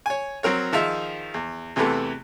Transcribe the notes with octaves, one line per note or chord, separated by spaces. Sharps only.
C#5 G#5
F#3 C4 A#4 C#5
D#3 F3 D#4 G#4 E5
E2
E2 C3 E3 A3 B3 A4